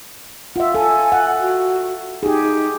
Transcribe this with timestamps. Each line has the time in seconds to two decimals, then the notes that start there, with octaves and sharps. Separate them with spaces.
0.56 F4 E5 F#5
0.75 A4 G#5
1.12 F#5
1.41 F#4
2.23 D#4 G4 G#4